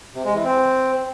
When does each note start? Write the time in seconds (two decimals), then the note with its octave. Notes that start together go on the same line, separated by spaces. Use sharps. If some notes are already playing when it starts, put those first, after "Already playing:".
0.15 C3
0.25 G#3
0.34 E3
0.44 C4